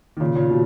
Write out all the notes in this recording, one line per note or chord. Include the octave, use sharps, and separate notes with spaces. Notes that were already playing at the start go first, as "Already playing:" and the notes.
D#3
A#2 C#3
A#2 C#3
B2 D#3